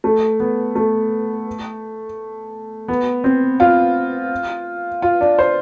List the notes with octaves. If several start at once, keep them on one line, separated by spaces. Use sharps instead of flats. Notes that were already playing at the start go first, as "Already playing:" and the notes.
A3
B3
A3
B3
C4
F4
F4
D4
C5